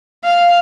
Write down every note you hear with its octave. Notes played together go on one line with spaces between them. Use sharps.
F5